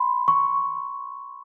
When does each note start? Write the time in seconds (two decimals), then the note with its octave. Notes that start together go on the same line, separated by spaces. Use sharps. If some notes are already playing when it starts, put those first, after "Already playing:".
Already playing: B5 C6
0.28 C#6